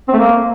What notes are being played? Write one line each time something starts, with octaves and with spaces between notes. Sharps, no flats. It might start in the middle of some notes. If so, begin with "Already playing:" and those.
C4
A3
A#3